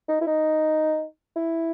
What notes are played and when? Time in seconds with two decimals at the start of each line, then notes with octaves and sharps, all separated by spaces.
0.08 D#4
0.21 E4
0.27 D#4
1.36 E4